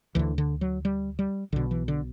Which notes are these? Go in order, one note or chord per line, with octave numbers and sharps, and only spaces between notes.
D2 D3 E3
D3
F#3
G3
G3
B1 B2 D3
E3
D3